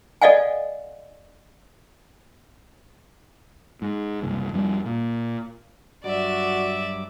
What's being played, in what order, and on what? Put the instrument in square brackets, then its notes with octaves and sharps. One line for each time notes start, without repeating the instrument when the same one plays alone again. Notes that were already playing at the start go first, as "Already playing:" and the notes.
[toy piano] A4 D5 D#5 F5 F#5 G#5
[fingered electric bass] G#2
F#1 C2
F2 G3
A#2
[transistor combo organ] G2 F#3 D6 [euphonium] F#4 [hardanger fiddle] D5 E5